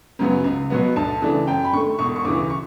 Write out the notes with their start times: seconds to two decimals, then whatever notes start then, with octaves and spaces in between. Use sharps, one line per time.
0.19 F#2 C#3 F#3 B3
0.44 C#2
0.70 B2 F#3 B3
0.96 D2 A5
1.22 C#3 E3 A3 D4
1.47 F#2 G5
1.65 B5
1.73 D3 A3 C#6
1.99 E1 C#6
2.16 C#6
2.24 D2 C#3 E3 D6
2.50 C#6